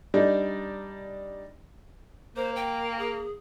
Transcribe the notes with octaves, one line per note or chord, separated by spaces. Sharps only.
G3 D4 D#4
A#3 C5
G5
G#4